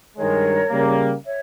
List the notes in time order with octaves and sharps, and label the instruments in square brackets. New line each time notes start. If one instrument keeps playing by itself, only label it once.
[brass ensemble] G2 D#3 G#3 [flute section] A#4 C#5
[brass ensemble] C#3 G3 A#3
[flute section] C#5 E5